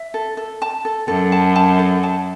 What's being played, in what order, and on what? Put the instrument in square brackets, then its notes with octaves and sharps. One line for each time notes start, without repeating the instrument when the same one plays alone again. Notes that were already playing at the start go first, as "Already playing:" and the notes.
Already playing: [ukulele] E5
A4
A4
A5
A4
[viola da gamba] F#2 [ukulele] A4
[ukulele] A5
A5
A4
A5